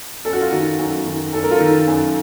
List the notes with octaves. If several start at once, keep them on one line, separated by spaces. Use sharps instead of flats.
F#2 A4
F#4
F4
D#3 F#4
F#2
D#3
F#2 A4
A#4
F4 A4
D#3
F#2